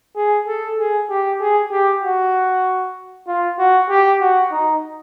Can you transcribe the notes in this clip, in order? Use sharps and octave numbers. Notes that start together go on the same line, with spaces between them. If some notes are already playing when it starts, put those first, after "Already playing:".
G#4
A4
G#4
G4
G#4
G4
F#4
F4
F#4
G4
F#4
D#4